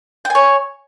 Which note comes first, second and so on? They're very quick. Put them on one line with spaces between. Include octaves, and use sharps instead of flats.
G5 G#5 C#5